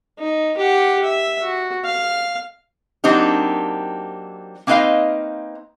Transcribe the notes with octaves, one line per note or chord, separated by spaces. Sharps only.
D#4
G4 F#5
E5
F#4
F5
F#3 A#3 C4 D4 D#4 G4
A#3 C4 D#4 B4 D#5 F5